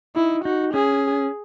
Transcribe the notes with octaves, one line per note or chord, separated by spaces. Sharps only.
D#4 E4
D#4 F#4
C#4 G#4